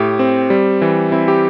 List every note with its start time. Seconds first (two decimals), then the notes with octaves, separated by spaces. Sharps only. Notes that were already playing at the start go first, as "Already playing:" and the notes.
Already playing: A2 G4
0.19 C4
0.50 G3
0.82 E3
1.12 C4 E4
1.28 G4